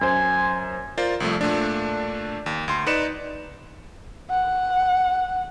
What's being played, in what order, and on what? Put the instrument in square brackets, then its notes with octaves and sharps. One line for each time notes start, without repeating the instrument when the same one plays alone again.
[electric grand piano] F#2 C5 [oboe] G#5
[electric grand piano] F4 A#4 C5 D5
C2 F3 A3
A#2 A3 D4
D#2
D2 C6
D#4 B4 D5 C#7 E7
[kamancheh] F#5